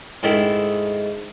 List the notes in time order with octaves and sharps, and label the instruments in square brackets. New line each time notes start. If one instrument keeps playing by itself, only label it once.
[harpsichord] G#2 D#3 A3 E4